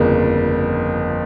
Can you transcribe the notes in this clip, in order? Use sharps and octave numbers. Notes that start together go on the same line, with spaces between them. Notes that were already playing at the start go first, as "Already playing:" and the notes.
Already playing: G1 F2 C#3 F3 A#3